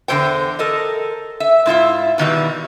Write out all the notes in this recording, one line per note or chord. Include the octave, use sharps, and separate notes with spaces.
E2 D3 E3 C5 G5
A4 A#4 D#5
E5
G#2 E4 F4 E5
B2 D#3 E3 G3